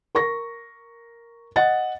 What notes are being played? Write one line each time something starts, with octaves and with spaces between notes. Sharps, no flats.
A#4 C#6 A#6
D#5 F#5 A6